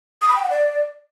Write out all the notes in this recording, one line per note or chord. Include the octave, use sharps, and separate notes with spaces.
D#6
B5
G5
F#5
D5